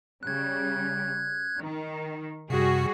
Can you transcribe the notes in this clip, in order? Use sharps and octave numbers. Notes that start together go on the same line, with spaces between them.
C#3 G3 F#6 G#6
D#3
F#2 C3 G3 F#4 G#4